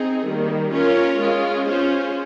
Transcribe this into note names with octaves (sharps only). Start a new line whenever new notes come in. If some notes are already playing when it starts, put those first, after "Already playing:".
Already playing: C4 D#4 G#4
D#3 G3 A#3
C#4 F4 A#4 C#5
G#3 C#4 F4 G#4
C#4 F4 G#4 C5